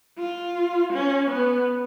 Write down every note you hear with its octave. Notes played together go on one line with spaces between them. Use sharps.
F4
C#4
B3